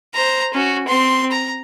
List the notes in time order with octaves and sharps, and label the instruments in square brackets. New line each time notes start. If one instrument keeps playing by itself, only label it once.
[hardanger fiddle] C5 A#5
C#4 F#4
C4 C6
A#5